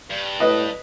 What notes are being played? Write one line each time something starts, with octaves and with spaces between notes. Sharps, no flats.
G2
A2 B4 D#5